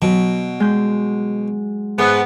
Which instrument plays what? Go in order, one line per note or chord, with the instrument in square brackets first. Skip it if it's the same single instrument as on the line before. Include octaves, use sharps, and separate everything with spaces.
[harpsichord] B2 [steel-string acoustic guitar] F#3
[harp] G#3 G6
[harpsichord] G#2 [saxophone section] B3